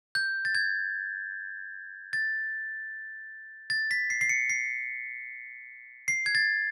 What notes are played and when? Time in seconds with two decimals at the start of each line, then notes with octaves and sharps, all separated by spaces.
0.15 G6
0.45 A6
0.55 G#6
2.13 A6
3.70 A6
3.91 B6
4.10 C7
4.21 C7
4.29 C#7
4.50 C7
6.08 C7
6.26 G#6
6.35 A6